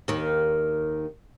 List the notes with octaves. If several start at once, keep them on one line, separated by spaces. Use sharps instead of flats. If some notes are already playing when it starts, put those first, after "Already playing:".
D#2 D#3